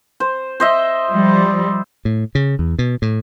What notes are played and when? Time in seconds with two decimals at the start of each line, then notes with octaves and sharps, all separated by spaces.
0.20 C5
0.60 C5 D#5 E5
1.11 F3 G3
2.05 A2
2.35 C#3
2.59 E2
2.79 B2
3.02 A2